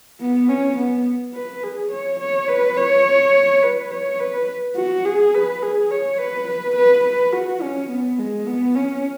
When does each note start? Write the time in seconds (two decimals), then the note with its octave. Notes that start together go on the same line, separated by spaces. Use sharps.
0.21 B3
0.49 C#4
0.77 B3
1.35 B4
1.63 G#4
1.92 C#5
2.20 C#5
2.48 B4
2.77 C#5
3.63 B4
3.91 C#5
4.19 B4
4.77 F#4
5.05 G#4
5.34 B4
5.62 G#4
5.91 C#5
6.18 B4
6.48 B4
6.76 B4
7.04 B4
7.33 F#4
7.62 C#4
7.90 B3
8.19 G#3
8.47 B3
8.75 C#4